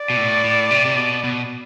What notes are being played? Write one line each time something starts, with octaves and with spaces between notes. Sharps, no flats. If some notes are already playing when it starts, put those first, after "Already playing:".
Already playing: D5
B2
A2
A2
C3
C3
B2
B2